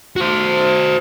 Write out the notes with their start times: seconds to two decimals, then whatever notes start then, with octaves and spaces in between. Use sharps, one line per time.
0.16 F#4 C5